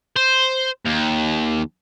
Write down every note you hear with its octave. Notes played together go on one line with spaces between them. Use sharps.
C5
D#2